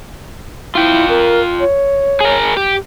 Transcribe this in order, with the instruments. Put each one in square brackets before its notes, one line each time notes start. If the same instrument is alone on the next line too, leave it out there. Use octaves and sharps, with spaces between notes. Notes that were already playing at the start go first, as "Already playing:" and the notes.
[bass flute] E4 [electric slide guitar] F4 G5
[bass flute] A#4
C#5
[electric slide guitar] G#4 A#4
G4